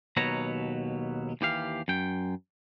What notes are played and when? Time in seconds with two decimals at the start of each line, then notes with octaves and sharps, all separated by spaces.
0.17 D#2 B2 F#3 B4 C#5 A#5
1.41 D#2 E3 G4 F5
1.88 F#2 G5